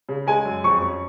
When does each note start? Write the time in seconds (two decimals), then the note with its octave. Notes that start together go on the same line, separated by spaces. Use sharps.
0.09 C#3
0.27 G#3 G#5
0.45 F#2
0.64 F2 C#6
0.82 C#4